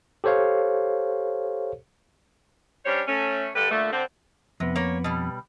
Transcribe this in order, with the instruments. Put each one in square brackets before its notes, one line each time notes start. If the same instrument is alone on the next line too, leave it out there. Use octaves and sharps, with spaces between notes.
[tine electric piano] G4 A4 C5 C#5 F5
[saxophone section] G3 C#4 D4 C5 C#5
A3 C#4
G2 D3 G3 A4 B4
A#2 D3 A3
D3 C4
[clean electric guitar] F2 B3 [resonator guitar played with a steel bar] C3
[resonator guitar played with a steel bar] A#3 C#5
B2 G3